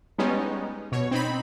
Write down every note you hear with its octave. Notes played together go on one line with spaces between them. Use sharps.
G3 G#3 B3 C#4 D#4
B2 C#5
C4 D#4 B5